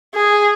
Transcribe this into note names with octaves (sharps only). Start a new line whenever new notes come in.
G#4